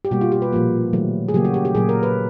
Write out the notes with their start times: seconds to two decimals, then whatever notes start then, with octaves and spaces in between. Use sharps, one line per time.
0.05 G4
0.11 B2 G3 A#3 F#4
0.21 F4
0.32 G4
0.42 B4
0.52 A#2 F3 A#3
0.93 D#3 F#3 A3
1.28 G#4
1.34 C#3 F#3 A#3 G4
1.45 F#4
1.54 G4
1.65 G4
1.75 A#2 F#3 A#3 G#4
1.89 A#4
2.03 B4